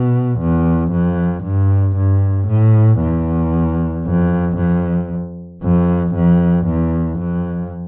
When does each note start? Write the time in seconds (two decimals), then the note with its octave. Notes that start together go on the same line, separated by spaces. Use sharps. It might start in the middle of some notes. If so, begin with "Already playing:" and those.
Already playing: B2
0.40 E2
0.92 F2
1.44 G2
1.96 G2
2.48 A2
3.01 E2
4.06 F2
4.57 F2
5.63 F2
6.15 F2
6.67 E2
7.19 F2